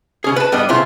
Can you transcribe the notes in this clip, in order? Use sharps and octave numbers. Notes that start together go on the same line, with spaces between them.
C#3 C#4 G#4
B4 A5
G2 G3 B3 D4 D#5
B1 C#3 E4 F4 C6